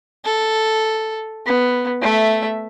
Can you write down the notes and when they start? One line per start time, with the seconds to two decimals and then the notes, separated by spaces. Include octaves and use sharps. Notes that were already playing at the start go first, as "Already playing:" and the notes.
0.25 A4
1.47 B3
2.01 A3 E5